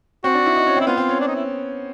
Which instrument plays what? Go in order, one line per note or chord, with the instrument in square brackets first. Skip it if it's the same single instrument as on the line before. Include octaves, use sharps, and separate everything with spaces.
[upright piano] C4 [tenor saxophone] F#4
[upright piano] D4
E4
D#4
C#4
C4
[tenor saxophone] E4
[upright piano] B3 [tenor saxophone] F4
[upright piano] C4
C#4
[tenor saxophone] D4
D#4
E4